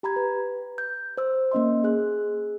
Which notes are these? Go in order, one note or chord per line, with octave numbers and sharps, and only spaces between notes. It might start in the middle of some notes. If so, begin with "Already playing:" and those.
G4 A#5 B5 G#6
B4
G6
C5 E6
A#3 C#4 D#5 C6
G#4 F#6